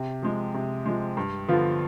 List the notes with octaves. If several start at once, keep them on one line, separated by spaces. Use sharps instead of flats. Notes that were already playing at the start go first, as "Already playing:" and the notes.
Already playing: C3
F3 G#3
C3
F3 G#3
G2
D3 F3 B3 F4